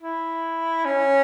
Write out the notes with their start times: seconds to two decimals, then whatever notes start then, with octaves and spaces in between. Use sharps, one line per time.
0.02 E4
0.85 C#4